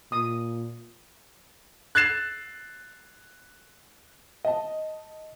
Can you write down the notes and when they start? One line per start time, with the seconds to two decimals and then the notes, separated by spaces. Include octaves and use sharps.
0.12 A#2 D#6
1.95 F#6 G#6 A6 C7 E7
4.45 D#5 A5